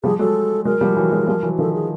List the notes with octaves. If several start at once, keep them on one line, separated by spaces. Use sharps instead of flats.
F3 G3 G#4
F#3 G#3 A4
F#3 G#3 A#4
F3 G3
E3 F#3
F#3 G#3
F3 G3
E3 F#3
D#3 F3 A4
G#4